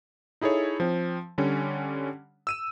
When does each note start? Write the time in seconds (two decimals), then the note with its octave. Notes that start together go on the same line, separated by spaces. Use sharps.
0.41 D#4 E4 G#4 A4 C#5
0.80 F3 C4
1.38 D3 G3 C#4
2.47 E6 D#7 E7